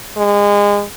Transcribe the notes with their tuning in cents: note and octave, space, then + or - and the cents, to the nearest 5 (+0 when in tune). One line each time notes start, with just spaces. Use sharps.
G#3 -30